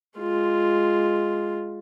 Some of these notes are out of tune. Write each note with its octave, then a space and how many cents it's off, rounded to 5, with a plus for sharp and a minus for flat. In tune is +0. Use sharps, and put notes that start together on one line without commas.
G#3 +0 F4 +0